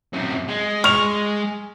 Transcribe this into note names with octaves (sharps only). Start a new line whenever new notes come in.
F#2 C3
G#3
C#6 F6 F7